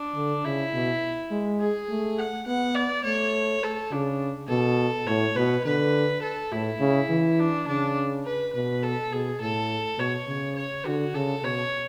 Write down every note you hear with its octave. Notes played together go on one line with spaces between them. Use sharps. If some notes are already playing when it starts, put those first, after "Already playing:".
Already playing: D4
D3
C#3 E4
B2
G#3
G#4
A3
F#5
B3 F#5
D5
A3 C#5
A4
C#3 D4
B2 A4
A2 C#5
B2 B4
D3 B4
A4
A2 E4
C#3
E3
D4
C#3 D4
B4
B2 B4
A4
B2 G#4
A2 A4
B2 C#5
C#3
C#5
D3 F#4
C#3 A4
B2 C#5